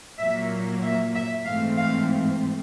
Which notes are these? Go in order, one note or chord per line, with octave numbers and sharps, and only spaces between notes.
A#2 F#3 A#3 E5
E5
E5
G#2 E3 A3 C4 F5
F5